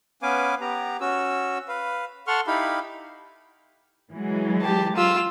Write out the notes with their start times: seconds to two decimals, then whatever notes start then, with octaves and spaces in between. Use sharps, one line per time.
0.22 B3 C#4 B4 F5 G#5 D6
0.61 B3 G4 A#5
1.01 C#4 F#4 E6
1.68 B4 F5
2.27 A4 F#5 C6 C#6 F6
2.47 D#4 E4 G4 F5 B5
4.12 E3 F#3 G#3
4.62 G4 A5
4.96 F4 E6